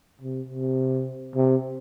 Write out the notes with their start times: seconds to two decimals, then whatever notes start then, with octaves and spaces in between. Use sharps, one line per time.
0.21 C3
0.49 C3
1.35 C3